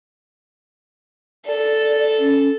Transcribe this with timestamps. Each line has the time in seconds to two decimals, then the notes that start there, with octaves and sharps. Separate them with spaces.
1.47 A4 D5
2.19 C#4